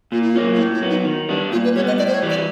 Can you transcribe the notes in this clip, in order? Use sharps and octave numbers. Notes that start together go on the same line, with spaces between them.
A#2 F4
E4
F4
F#3 A#3 C#4
F4
A2 E4
E4
F#3 B3
D#4
D#3
G3 B3 D4
A#2 F4
B4
G3 B3 C#5
D#5
A2 D5
C5
C#5
E3 G3
D5